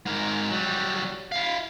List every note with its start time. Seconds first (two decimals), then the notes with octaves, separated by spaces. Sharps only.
0.06 G#2 A#4
0.51 F#3 G3
1.32 E4 F5